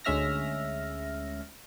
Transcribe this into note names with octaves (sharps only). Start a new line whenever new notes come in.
D2 G#3 C#4 E5 F6 A#6